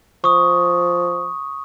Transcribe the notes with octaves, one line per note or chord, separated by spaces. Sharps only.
F3 C#6 D#6